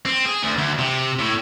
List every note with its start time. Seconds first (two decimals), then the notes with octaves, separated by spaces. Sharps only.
0.06 C4
0.26 G#4
0.43 D2
0.58 D2
0.78 C3
1.19 A2